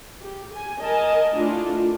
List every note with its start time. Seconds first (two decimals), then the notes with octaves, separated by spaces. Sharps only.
0.21 G4
0.54 G#5
0.82 A#4 D#5 G#5 A5
1.34 A3 D4 E4 F4